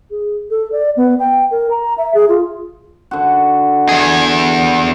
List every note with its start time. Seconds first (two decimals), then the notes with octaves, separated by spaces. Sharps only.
0.11 G#4
0.50 A4
0.72 D5
0.97 B3
1.19 G5
1.51 A#4
1.70 A#5
1.98 E5
2.14 G#4
2.29 F4
3.11 D3 F#4
3.89 E2 G#4